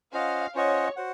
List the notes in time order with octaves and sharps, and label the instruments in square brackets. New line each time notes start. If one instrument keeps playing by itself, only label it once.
[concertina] C#4 F4 C5 D#5 F#5 [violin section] F5
[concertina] C#4 F4 C5 D#5 F#5 [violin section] C#5
[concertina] F#4 C5 F#5